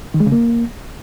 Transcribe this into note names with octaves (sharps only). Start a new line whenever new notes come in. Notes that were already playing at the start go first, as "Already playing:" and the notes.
D#3
G#3
C#3
A#3